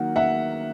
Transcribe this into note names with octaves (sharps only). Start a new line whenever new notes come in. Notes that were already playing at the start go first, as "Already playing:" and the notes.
Already playing: D#3 F#3 A#3 F#5
E5 F#5